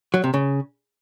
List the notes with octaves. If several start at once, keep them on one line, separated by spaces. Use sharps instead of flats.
F#3
C3
C#3